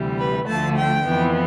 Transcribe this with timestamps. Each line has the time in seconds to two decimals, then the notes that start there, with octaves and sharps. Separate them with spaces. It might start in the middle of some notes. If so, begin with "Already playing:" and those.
Already playing: D2 C3 E3 G3
0.19 B4
0.47 D2 D3 F3 A3 A5
0.77 G5
1.06 F2 E3 B3